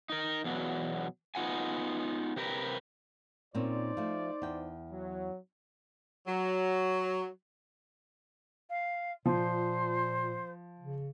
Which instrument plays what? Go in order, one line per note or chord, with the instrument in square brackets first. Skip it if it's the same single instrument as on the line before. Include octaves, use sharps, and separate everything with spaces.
[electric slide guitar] D#4 A#4
E2 B2 F#3
B3 D#4 F4 F#5 G#5
C3 G4 A#4 B4
[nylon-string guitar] A#2 C4 C#4 [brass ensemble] D#4 C5 D5
[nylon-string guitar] F3 A3
E2 G5
[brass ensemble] F#3
[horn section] F#3
[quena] F5
[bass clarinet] A#2 [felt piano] F3 [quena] C5
[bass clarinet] C#3